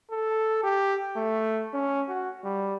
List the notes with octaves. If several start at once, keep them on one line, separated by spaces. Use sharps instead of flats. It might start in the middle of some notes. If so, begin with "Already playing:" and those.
A4
G4
A3
C#4
F#4
G3